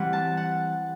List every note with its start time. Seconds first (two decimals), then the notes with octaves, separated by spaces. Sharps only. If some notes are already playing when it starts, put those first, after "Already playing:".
Already playing: E3 G3 C4 F#5
0.13 A5
0.37 F#5